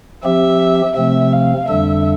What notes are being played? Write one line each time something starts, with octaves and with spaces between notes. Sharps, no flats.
F3 C4 G4 E5
C3 F3 A3 C4 E5
F5
F2 D3 G3 D4 A4 E5